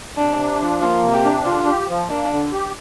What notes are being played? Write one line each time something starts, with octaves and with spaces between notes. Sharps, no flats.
C3 D4
D4
F3
A#3 F4
C3
G4
D4
D3 F4
G4
F3
A#3 D4
D3
G4